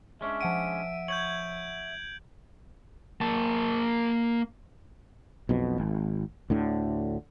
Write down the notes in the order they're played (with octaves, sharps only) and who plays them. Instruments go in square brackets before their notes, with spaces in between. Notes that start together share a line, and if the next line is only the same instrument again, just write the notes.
[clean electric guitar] G#3 C#4 D4 [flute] E5
[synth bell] F3 F#5 D#7 [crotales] D7
[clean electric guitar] C#5 [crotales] G6 G#6 F#7
[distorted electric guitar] A#3 A5
[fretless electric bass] B1 F2 B2
G#1
D2 A2 D3